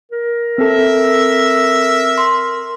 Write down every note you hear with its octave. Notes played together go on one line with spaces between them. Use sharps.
A#4
C4 A4 E5
C6